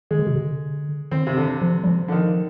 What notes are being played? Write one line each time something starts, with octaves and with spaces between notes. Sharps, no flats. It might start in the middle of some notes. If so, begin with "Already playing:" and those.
D#3 G#3
D3
C3
D3
D#3 C4
C3
D3
F3
G3
F3
D3
D#3